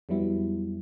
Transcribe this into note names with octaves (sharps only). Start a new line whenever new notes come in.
F2 F#3 G3 B3 E4